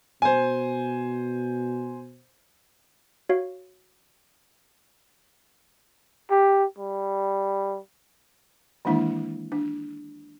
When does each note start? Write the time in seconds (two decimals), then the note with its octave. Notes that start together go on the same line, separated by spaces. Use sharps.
0.22 B2 C5 G#5
3.29 F#4 C#5 F5
6.31 G4
6.78 G3
8.85 D#3 E3 G#3 A#3 D4 E4
9.52 D4